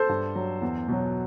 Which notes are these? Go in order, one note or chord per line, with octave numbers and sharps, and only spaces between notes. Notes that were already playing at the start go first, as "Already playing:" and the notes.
Already playing: A4 C5
G2
F#3
E2
B2 F#3